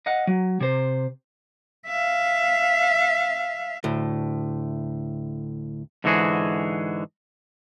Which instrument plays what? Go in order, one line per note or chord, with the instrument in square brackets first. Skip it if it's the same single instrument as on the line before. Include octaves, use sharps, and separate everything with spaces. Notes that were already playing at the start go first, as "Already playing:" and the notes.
[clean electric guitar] D#5 F5 F#5
F#3
C3 C5
[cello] E5 F5
[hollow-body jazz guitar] D2 A2
[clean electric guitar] G#2 D3 E3 F#4 G#4